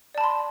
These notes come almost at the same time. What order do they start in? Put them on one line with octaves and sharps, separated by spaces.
D5 A5 B5 C6